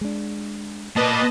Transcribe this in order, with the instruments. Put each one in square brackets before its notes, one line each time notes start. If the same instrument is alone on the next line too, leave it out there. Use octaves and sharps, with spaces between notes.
[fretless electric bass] G#3 D4
[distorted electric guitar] A#3 D5 [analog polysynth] B4 D#5 A5